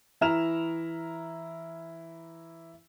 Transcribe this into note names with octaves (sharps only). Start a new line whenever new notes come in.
E3 E4 A#5 F6 E7 F7